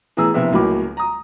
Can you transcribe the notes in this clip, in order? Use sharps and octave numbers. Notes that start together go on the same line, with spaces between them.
A2 E3 B3 G#4 A#5 E6
A#1 C3 B3 E4 E5
C#2 A2 F#3 A#3 B5 D6
A#5 D#6